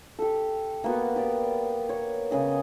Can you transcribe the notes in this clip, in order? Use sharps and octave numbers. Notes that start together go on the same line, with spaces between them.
G4 A4
A#3 B3 F#4
G4 D5
C#5
C#3 G#4 D#5